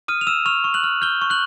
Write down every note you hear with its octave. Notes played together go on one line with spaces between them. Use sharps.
D#6 F6 D#7
F7
E6 F6 E7
C#6 F6 F7
C#6
F#6 F#7
F6
F6 G6 G7
C#6
F#6 F#7